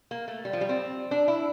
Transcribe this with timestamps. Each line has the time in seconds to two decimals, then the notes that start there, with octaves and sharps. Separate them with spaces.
0.11 A#3
0.28 A3
0.45 G3
0.53 F3
0.61 G3
0.69 C4
1.11 D4
1.28 E4